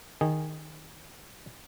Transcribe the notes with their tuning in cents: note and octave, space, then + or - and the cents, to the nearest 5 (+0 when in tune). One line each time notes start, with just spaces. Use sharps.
D#3 +0 G#4 -10